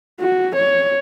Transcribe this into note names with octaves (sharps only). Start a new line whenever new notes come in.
F#4
C#5